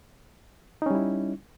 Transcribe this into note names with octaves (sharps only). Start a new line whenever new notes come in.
G3 C#4 D#4 E4